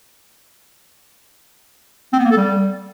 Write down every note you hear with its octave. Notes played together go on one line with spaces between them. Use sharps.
C4
B3
A#3
A4
G3